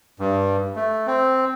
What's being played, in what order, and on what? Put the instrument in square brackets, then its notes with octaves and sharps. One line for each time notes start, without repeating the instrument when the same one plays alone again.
[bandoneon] G2
A3
C4